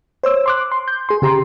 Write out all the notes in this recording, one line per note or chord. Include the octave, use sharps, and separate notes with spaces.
C5 C#5 E6
C6 D6 F#6
C6
G6
G#4 C6
C#3 G4 A#5 C6